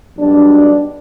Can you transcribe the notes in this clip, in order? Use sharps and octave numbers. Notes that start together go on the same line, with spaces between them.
B1 B2 G3 D4